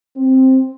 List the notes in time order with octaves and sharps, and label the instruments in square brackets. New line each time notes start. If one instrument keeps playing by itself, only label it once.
[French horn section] C4